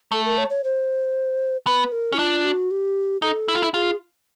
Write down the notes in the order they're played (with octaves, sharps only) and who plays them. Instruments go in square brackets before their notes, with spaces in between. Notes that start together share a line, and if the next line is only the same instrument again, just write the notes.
[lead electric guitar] A3 [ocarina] A4
[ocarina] A#4
C#5
C#5
C5
[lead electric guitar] B3 [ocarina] B4
[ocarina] A#4
[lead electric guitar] C#4 [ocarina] E4
[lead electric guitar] D4 [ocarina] F4
[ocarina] F#4
G4
[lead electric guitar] D#4 [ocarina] A4
[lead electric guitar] E4
F4
E4
[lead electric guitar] F4 [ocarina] G#4